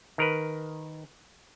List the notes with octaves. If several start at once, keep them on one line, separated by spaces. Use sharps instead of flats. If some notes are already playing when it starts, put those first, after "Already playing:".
D#3 A#4 B4